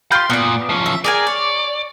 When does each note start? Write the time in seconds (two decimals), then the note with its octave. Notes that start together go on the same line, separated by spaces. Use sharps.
0.11 F4 G4 B5 C6 G6
0.30 A#2 B3 D5
0.70 F3 C#4
0.86 E5
1.04 G#4 A#4 D5 G#5
1.27 C#5